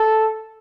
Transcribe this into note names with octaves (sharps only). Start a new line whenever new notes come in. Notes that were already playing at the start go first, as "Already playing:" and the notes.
Already playing: A4